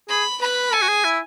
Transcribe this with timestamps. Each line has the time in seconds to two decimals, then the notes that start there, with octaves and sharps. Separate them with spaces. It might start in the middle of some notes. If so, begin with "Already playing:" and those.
0.09 G#4 B5
0.41 B4 B5
0.72 A4 G#5
0.82 F#4
0.88 G#4
1.05 E4